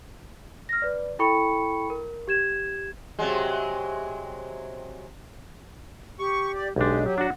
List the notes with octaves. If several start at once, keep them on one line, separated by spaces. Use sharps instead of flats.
F6 A#6
B4 D5
E4 A4 G5 B5 C#6 C#7
A#4
G4 G#6 E7
C3 F#3 G#3
G4 C#6
D5
B1 G#3 D4 G4
F#3 G4
D4 F#4 F#5